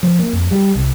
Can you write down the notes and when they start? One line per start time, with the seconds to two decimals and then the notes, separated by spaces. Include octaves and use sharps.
0.03 F3
0.19 A#3
0.33 F2
0.51 G3
0.75 C2